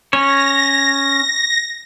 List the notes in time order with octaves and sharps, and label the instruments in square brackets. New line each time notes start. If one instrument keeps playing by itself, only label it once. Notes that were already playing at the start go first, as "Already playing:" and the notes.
[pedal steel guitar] C#4 C#5 [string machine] A#6